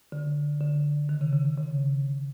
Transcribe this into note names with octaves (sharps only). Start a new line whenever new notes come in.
D3
D3
D#3
C#3
C#3
C#3
C#3